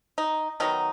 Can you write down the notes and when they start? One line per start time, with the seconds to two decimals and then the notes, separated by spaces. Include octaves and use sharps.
0.18 D#4
0.60 D#3 F#3 B3 D#4